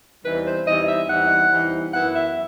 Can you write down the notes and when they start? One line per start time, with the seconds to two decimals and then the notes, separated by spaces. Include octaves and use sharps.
0.24 E2 C3 E3 G3 D#4 B4
0.46 C5
0.66 E2 C3 E3 G3 D#4 D#5
0.87 E5
1.09 E2 C3 E3 G3 D#4 F#5
1.51 E2 C3 E3 G3 D#4
1.93 F#2 E3 B3 E4 F#5
2.14 E5